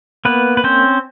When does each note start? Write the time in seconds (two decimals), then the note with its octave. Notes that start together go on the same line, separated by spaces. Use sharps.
0.25 A#3 B3 B4
0.57 B4
0.64 C4 C#4 C5